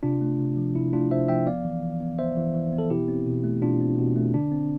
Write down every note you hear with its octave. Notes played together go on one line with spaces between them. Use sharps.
C3 D4 F4
A3
C3
F3
C3 E4
A3 D4 F4
C3 C5 E5
F3 E5 G5
B3 D5 F5
E3
E3
B3
B3 C5 E5
E3
E3
B3
A4
B2 E4 G4
C4
B2
A3
B2 D4 F4
C4
B2
A3
D3 D4
C4